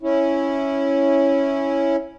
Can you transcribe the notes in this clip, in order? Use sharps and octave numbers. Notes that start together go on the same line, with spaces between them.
C#4 E4